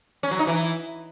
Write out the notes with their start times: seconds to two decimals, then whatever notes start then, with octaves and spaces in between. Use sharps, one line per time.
0.23 C#4
0.31 F#3
0.39 D#4
0.47 E3